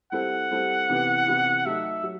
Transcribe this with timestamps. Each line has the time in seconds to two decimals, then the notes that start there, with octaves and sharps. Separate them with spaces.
0.12 G3 C4 E4 A4 F#5
0.51 G3 C4 E4 A4
0.89 C3 E3 B3 E4 G4
1.27 C3 E3 B3 E4 G4
1.66 F#3 A3 D#4 A4 E5
2.04 F#3